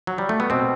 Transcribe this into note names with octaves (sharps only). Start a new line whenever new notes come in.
F#3
G3
A3
B3
B2 C4